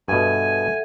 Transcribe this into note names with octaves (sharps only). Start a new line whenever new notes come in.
G2 B2 A4 E5 F#5 G#5